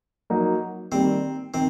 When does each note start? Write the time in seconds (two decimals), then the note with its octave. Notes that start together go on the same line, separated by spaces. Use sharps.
0.30 F#3 A#3 D#4
0.92 D#3 G3 A#3 C4
1.54 D#3 C4